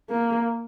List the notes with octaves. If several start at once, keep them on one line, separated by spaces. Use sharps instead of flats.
A#3